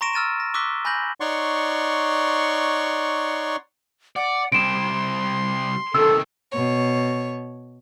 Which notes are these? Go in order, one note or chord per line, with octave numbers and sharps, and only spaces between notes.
A#5 C6 C#6 A#6 D7 E7
E6 F6 A6 D#7 E7
A#6
C#6 D6 E6 F#6 B6 G7
G#5 B5 F#6 G6 A#6 F#7
D#4 C#5 D5 F#5 C6 C#6
D5 F#5
C3 G3 C6 D7 E7
C3 D#3 A4 E6
B2 C#5